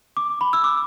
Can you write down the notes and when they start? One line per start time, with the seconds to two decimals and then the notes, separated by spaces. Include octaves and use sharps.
0.17 D6
0.41 B5
0.53 E6
0.64 D6